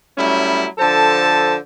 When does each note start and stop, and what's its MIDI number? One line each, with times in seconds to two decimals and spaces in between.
0.18 0.66 54
0.18 0.66 55
0.18 0.66 57
0.18 0.66 61
0.18 0.66 64
0.78 1.57 50
0.78 1.57 53
0.78 1.57 69
0.78 1.57 72
0.78 1.57 81